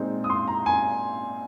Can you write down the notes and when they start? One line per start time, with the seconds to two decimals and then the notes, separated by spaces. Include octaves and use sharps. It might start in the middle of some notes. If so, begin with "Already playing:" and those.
Already playing: A#2 G#3 C4 D#4
0.24 D#6
0.30 C6
0.48 A#5
0.66 G#5